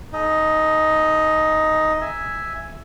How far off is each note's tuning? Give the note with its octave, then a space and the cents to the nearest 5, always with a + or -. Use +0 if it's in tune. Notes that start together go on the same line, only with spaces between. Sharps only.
D#4 +5 A4 -40
E5 +0 G#5 +0